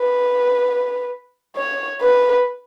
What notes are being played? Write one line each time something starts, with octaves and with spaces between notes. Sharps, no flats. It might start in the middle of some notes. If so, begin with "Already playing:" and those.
Already playing: B4
C#5
B4